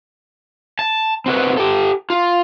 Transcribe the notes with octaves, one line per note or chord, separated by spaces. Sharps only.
A5
C4 F#4 B4
G4 A4
F4